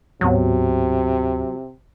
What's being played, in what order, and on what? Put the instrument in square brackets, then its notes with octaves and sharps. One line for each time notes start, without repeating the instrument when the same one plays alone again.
[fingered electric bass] D1 G#2 B3 [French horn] C3 [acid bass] F#3